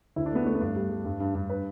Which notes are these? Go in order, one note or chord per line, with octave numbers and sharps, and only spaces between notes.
D2 E4
D4
A3 B3
A3 D4
B3
G2 D4
G3
G3
G2
G2
G2
B4